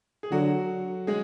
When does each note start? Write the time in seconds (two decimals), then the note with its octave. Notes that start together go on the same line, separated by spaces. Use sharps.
0.23 G#4
0.31 D3 F#3 F#4
1.07 G#3 G#4